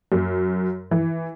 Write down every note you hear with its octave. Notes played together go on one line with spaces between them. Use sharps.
F#2
E3